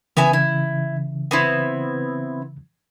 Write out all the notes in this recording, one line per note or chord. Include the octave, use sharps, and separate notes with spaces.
C#3 E3 B3 E5 G#5
E4
B3 C4 E4